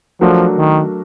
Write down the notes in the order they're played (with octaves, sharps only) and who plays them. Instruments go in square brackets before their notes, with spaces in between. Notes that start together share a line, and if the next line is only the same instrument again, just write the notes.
[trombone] F3 [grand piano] F#3 A3 D4 F#4 A#4
[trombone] D#3